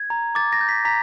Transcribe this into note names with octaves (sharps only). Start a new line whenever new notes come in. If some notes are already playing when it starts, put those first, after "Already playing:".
Already playing: G#6
A#5
D6 A6
A#6
G6
B6
A#5 B6